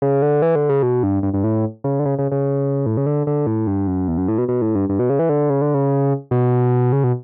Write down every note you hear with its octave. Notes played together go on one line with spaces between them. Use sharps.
C#3
D3
E3
D3
C#3
B2
G2
G2
G2
A2
C#3
D3
C#3
C#3
C#3
A2
C#3
D3
D3
A2
G2
F#2
E2
F#2
A2
B2
B2
A2
G2
G2
B2
C#3
E3
D3
C#3
D3
C#3
B2
C#3
B2